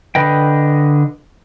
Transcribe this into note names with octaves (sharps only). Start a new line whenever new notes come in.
D3 B4 D#5 G5